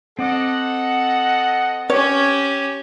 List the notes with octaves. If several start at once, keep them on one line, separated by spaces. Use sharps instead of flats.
C4 A4 D#5 F#5 D6
C#4 G4 C#5